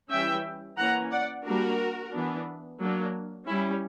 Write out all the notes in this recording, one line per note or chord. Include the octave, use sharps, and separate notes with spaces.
E3 G3 C#4 E5 G5
E3 A#3 C#4 F#5 A#5
D5 F#5
G3 A#3 D4 F#4 A#4
E3 B3 D4
F#3 A#3 D4
G3 C#4 E4